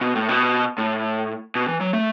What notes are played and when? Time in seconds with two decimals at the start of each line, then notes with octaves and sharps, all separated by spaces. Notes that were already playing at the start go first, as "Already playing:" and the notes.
0.01 B2
0.15 A2
0.29 B2
0.78 A2
1.55 B2
1.68 E3
1.81 F#3
1.93 A3